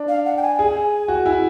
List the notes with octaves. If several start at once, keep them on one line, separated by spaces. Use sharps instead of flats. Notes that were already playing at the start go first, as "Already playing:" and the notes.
Already playing: D4
F5
F#5
G5
G#5
G#4
F#4
E4